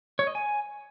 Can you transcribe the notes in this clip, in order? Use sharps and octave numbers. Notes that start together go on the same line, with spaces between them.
C#5
D#5
G#5